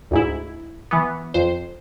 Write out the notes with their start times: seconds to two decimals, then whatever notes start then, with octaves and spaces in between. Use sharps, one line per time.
0.11 D2 G#2 E4
0.91 E3 B3
1.34 F2 C5